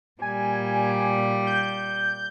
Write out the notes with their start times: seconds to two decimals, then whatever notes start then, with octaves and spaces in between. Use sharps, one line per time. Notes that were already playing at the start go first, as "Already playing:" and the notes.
0.22 A#2 G3 G#5
1.47 G6